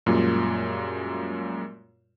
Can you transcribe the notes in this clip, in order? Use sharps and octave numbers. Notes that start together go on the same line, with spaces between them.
F#2 A#2 G3 G#3 A#3 F4